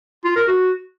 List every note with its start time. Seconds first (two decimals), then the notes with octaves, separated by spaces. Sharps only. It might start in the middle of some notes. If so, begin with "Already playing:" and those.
0.25 F4
0.36 A#4
0.47 F#4